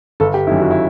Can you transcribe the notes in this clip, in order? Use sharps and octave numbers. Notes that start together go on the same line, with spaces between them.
G1 A4
G4
F#2 D#3 E4
F#4
E4